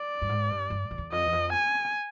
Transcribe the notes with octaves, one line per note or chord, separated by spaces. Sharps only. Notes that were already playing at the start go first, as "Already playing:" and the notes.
Already playing: D5
G2
G#2
G2
G2
F2
E2
F2 D#5
E2
F2
G#5